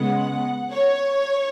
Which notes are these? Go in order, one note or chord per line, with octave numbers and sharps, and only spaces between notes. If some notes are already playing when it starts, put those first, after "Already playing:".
Already playing: C#3 G#3 B3 F#5
C#5